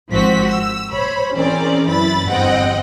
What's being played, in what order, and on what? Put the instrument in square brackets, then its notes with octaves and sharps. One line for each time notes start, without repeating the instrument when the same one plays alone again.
[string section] G#1 G#2 F3 C4 F#4 B6
E6
C5 C#5 B5
E3 C4 C#4 G#4 A#4 D5
F#2 E4 B4 B5 A6
G1 E2 C4 D#5 F#5 G5